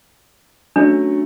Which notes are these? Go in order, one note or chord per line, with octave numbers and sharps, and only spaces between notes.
F#3 A3 C#4 D4